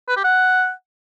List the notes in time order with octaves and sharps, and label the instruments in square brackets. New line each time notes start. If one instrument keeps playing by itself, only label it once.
[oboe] B4
G4
F#5